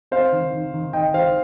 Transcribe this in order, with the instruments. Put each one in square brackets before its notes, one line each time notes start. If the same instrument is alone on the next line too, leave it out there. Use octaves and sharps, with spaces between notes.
[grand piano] C4 C5 F5
D#3
D#3
D#3
D#3 D#5 G5
D#3 C5 F5